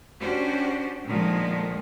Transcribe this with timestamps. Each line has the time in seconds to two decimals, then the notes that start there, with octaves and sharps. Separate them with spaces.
0.19 C#4 D4 F#4 G4 C5 D5
1.08 A#2 D3 D#3 F3 G#3